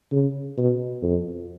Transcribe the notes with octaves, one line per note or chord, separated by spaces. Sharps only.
C#3
B2
F2